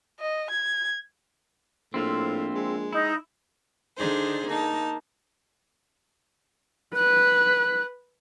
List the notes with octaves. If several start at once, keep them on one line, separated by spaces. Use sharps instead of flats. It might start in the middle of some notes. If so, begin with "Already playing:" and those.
D#5
G#6
A#1 A2 C4 E4 F4
G#3
D#4 E4
D3 D4 D#4 G#4 C5
A#3 D#4 A5
B4 F#6